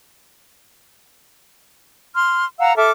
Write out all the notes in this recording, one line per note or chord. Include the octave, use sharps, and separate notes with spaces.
C6 F6
F5 F#5 A#5 E6
A4 E5 D6 F6